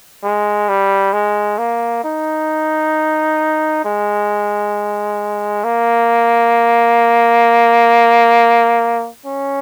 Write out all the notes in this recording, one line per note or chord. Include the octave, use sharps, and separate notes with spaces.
G#3
G3
G#3
A#3
D#4
G#3
A#3
C#4